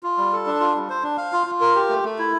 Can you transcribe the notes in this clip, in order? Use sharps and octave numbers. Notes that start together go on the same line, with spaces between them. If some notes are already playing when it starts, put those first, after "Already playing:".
F4
G3
A4
D4
F4
G3
C5
D4
F5
F4
F4
A#4
G4
A3
A3
E4